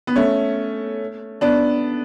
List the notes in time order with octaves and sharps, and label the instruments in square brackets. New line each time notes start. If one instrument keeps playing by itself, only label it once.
[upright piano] B3
A3 C#4
B3 D4